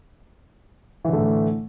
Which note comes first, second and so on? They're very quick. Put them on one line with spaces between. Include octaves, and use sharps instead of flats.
E3 D3 A3 A2